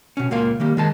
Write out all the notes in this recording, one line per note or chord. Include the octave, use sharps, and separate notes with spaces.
B2 C#4
C#2 A#2 A#3 F5
D#3 G3 A#3
D#3 G#3 A5